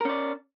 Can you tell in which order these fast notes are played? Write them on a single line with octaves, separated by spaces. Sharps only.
A#4 C#4 D5